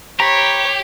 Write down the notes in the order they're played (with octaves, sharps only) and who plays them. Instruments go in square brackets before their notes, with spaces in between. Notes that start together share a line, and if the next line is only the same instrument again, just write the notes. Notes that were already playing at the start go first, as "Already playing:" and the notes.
[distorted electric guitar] G4 [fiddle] C#5 [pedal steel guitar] A#5 B5